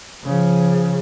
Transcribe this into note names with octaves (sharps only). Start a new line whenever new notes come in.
C#3 F3